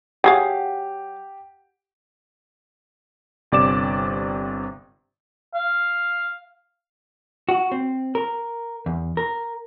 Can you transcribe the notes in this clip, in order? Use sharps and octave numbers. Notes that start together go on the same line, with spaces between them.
F#3 G4 G#4 F5 F#5
G1 C3 D5 D6 E7
F5
F#4
C4
A#4
E2
A#4